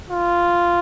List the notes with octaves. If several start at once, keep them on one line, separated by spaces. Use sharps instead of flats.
F4